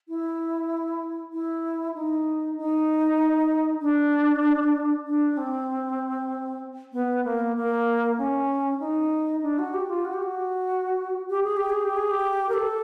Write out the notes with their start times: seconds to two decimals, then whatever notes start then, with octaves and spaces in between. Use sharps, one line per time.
0.09 E4
1.32 E4
1.95 D#4
2.58 D#4
3.81 D4
5.06 D4
5.37 C4
6.93 B3
7.24 A#3
7.56 A#3
8.18 C#4
8.80 D#4
9.42 D4
9.59 F#4
9.74 G4
9.90 F4
10.05 F#4
10.14 G4
10.23 F#4
11.30 G4
11.43 G#4
11.57 G4
11.70 G#4
11.84 G4
11.97 G#4
12.11 G4
12.49 A#4
12.54 A4